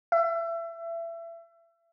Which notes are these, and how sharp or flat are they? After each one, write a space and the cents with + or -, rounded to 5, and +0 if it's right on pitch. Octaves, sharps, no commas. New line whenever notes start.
E5 +30